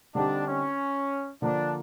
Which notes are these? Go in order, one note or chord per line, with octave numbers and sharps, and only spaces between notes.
D3 G3 C4 D4 D#4 G4
C#4
D3 F3 A#3 D4